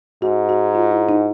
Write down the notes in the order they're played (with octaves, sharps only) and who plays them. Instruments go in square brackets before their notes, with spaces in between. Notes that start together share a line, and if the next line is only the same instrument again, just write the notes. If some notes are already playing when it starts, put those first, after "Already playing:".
[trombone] G#2 [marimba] F#4
[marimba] F#4
F4
E4
D#4